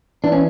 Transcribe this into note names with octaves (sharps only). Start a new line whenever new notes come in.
E3 D4
C#4